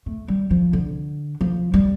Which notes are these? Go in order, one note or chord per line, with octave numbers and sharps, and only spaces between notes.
A3
G3
F3
D3
F3
G3